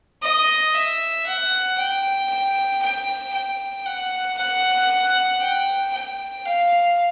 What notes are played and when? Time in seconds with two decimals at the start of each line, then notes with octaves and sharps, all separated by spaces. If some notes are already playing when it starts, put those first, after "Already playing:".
0.22 D#5
0.74 E5
1.26 F#5
1.78 G5
2.29 G5
2.82 G5
3.34 G5
3.86 F#5
4.37 F#5
5.41 G5
5.93 G5
6.46 F5